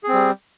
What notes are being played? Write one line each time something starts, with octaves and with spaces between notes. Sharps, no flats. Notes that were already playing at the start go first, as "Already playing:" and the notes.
G3 C4 G#4